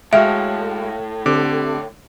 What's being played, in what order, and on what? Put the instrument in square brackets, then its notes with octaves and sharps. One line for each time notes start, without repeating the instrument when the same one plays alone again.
[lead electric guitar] A2 [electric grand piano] G#3 F#4 [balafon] E5 [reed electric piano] F5 G5 F6
[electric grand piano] D3 D6 [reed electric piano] C4 G4